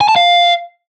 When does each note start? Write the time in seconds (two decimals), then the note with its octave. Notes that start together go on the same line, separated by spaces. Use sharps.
0.01 G#5
0.09 A5
0.16 F5